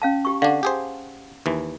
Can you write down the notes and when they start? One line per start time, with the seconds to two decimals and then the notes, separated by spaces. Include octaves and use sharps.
0.02 C#4 F5 A5
0.25 G4 C#6
0.42 D3 D4 F5 F#5 A5
0.63 G4 G#4 C5
1.46 D#2 E3